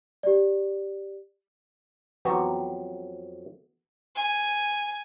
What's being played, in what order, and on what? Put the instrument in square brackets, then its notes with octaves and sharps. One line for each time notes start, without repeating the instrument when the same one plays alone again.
[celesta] G4 D5
[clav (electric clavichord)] F2 F#3 G4 [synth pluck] E3 B3 F#4
[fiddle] G#5